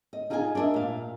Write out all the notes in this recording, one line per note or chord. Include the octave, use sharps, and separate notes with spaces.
D#5
D#4 F4 G#4 D#5 G5 G#5
D4 A#4 C5 D#5 E5
A#2 F5